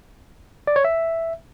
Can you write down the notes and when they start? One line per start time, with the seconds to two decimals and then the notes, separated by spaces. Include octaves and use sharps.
0.67 D5
0.76 C#5
0.85 E5